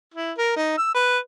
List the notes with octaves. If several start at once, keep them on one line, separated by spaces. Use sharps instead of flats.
E4
A#4
D#4
E6
B4